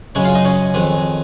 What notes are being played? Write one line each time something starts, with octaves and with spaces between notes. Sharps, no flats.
F#2 C#3 G#3 C#4 C#5
F4 F5
D#4 D#5
C#4 C#5
F2 D#3 G#3